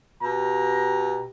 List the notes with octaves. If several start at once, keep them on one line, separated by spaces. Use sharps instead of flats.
B2 G4 A#5